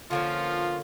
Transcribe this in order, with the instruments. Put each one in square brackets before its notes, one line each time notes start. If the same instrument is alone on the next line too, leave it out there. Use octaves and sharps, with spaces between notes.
[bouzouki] D3 A#3 C#4 [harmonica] F3 [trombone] F4